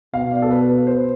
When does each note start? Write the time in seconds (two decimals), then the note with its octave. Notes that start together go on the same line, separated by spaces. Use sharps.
0.14 B2 F5
0.32 D5
0.42 A4
0.51 B4
0.69 B4
0.87 C5